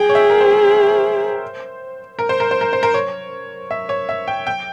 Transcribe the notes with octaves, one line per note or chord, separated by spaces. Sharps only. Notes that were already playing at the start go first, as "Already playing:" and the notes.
Already playing: G#4 G5
C#5
E5
A#4
C5
A#4
C5
A#4
C5
A#4
C5
A#4
C#5
E5
C#5
E5
G5
G5